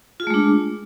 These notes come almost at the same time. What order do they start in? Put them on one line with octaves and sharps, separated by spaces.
F4 G#4 A3 G#3 D4